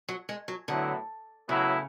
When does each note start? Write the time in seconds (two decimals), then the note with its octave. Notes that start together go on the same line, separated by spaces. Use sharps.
0.09 F#3
0.29 G#3
0.48 F#3
0.68 A2 D3 F#3 B3 E4
1.48 A2 C#3 F#3 B3 E4